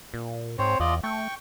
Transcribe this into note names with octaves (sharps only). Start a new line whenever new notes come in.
A#2
G#2 C4 C5 C#5
E2 F4 D5 D#5
A3 G5 C#6